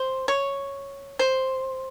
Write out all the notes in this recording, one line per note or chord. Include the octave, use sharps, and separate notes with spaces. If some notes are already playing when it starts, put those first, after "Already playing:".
Already playing: C5
C#5
C5